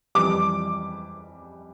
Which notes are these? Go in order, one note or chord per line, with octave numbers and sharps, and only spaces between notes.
F2 E3 G3 D6